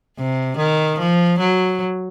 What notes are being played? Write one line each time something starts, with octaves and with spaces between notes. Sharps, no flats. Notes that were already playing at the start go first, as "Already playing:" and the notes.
C3
D#3
F3
F#3